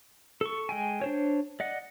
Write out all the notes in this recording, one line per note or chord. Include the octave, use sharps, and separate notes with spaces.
A4 C#6
G#3 G5 G#5
D4 C5 C#5
D5 D#5 F#5